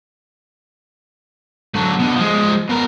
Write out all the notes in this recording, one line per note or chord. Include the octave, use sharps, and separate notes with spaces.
D3 F#3
B2 D3
F3 G#3
B2 A#4